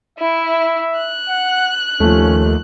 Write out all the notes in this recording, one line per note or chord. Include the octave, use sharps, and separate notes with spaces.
E4 E5
F#6
F#5
D#2 F3 A3 C#4